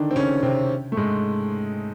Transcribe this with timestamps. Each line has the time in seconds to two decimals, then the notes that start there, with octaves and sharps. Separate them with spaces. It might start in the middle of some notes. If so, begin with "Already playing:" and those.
Already playing: D3 D#3 D4 D#4
0.11 C4
0.16 C#3 C#4
0.43 C3 C4
0.92 A3
0.97 G#2 G#3